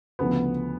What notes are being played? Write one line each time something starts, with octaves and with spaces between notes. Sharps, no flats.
D2 C#3 F3 B3